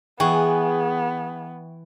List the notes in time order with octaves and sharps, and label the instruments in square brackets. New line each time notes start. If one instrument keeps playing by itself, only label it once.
[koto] E3 [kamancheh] B3 [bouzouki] G#4 [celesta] G5 C#6